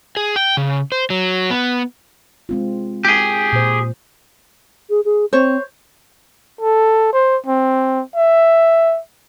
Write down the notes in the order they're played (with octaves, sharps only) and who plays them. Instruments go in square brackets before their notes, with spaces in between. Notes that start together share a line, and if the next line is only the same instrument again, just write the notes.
[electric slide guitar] G#4
G5
C#3
C5
F#3
B3
[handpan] G#3 C4 F4
[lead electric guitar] G4 G#4
[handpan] A#2 C5
[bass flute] G#4
G#4
[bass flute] C4 [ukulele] C5 C#5
[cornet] A4
C5
C4
E5